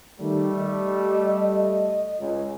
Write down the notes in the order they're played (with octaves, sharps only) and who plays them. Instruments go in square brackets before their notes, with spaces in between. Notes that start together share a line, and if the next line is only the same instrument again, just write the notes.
[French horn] D#3 [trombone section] G3 A3
[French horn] D#5
[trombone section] C#2